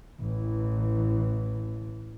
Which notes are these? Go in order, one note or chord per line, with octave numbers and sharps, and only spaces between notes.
A1 E3